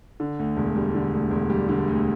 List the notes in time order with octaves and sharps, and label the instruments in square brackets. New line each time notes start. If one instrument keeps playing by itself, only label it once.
[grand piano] D3
D2
E1
G3
D3
D2
E1
G3
D3
D2